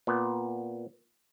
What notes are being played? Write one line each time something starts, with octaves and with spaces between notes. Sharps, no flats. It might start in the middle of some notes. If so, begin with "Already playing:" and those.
A#2 B3